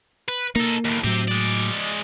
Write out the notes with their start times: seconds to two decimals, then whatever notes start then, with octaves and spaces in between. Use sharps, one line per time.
0.28 B4
0.56 A#3 D#4 A4
0.85 D#2 A2
1.04 A2 F#3 C4 G4
1.28 G#3 D5